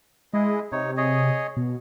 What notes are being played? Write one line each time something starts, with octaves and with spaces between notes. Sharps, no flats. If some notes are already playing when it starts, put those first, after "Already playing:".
G#3 E4 G#4 D#5
C3 D#4 C#5
G#4 C#5 D#5
B2